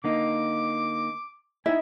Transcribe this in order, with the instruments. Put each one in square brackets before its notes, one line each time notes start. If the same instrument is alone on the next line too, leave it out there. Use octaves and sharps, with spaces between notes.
[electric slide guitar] D3 A#3 D#4 [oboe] D6
[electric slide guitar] D#4 E4 [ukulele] E5 [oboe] G#5